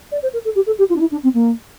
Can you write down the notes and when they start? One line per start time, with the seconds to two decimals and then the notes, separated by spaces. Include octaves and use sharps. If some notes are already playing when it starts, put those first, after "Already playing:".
0.12 D5
0.22 C5
0.33 A#4
0.45 A4
0.55 G4
0.66 A4
0.78 G4
0.89 F4
0.96 D4
1.00 E4
1.11 D4
1.23 C4
1.34 A#3